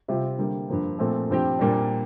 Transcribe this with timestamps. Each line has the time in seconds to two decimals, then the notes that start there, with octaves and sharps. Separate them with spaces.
0.08 C3 G3 C4 F4
0.38 D3 G3 A#3
0.69 G2 F3 A#3
0.99 A#2 F3 A3 C4
1.30 G2 F3 C4 G4
1.59 A#2 G3 A#3 D4